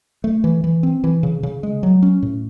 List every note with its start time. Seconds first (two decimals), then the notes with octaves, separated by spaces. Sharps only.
0.24 A3
0.44 E3
0.64 E3
0.83 C4
1.04 E3
1.23 C#3
1.43 C#3
1.63 G#3
1.83 F#3
2.02 C#4
2.23 A2